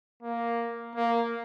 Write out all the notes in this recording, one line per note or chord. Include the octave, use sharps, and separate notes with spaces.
A#3
A#3